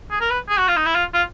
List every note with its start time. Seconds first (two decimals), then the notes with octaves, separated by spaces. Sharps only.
0.11 G#4
0.21 A#4
0.30 B4
0.49 G#4
0.58 F#4
0.68 F4
0.77 D#4
0.86 E4
0.95 F4
1.14 F4